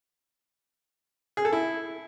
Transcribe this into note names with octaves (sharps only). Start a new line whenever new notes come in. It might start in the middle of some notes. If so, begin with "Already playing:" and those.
G#4
A4
E4